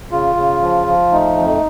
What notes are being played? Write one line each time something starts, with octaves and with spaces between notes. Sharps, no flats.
C#3 F4
C#3
F3
F3
A3 D#4
F2